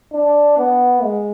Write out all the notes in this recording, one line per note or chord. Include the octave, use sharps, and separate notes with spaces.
D4
B3
G#3